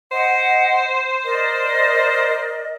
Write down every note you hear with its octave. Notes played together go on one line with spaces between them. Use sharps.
C5 D#5 F#5
A#4 D5 D#5